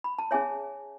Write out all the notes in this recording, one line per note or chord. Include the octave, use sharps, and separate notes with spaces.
B5
A5
C#4 G#4 C#5 E5 G#5